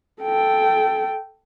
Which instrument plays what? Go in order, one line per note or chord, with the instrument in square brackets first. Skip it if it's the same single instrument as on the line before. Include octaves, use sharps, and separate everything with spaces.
[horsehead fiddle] A4 G5